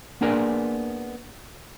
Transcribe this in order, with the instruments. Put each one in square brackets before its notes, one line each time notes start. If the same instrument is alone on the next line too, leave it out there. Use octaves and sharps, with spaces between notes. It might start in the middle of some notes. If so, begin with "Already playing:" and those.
[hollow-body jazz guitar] A#3 B3 D4 G#4 A#4 D5